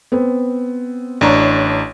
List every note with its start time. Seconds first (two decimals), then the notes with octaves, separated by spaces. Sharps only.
0.12 B3 C4
1.21 A1 D4 C#5 A#5 C#6